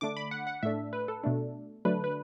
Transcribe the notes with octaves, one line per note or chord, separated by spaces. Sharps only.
D3 A3 D4 D6
B5
F#5
F#5
A2 A3 D4 E5
B4
A4
B2 A3 D4
D3 F#3 A3 D4 B4
B4